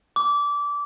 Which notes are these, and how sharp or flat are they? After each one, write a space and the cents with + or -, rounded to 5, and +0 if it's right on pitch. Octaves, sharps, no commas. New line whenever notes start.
D6 -20